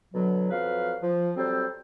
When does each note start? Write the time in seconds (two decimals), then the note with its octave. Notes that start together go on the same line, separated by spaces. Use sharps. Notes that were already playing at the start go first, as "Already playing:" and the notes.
0.13 B2 D3 F#3
0.51 F2 F#3 B4 F5
1.02 F3
1.37 F#3 G3 C4 A4 C5